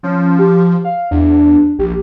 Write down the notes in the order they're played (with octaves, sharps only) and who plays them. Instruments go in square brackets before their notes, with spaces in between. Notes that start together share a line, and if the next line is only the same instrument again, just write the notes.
[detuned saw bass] F3 [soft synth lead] C#4
[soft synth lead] G4
F5
[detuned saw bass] E2 [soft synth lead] D4
[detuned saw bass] A#1 [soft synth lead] G4